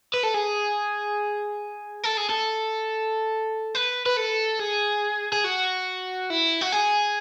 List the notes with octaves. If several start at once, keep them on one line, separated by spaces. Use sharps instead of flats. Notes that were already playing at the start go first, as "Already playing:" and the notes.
B4
A4
G#4
A4
G#4
A4
B4
B4
A4
G#4
G#4
F#4
E4
F#4
G#4